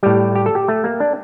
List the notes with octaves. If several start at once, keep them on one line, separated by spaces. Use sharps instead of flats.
A2 G3 G4
G4
A4
G4
A3
A#3
D4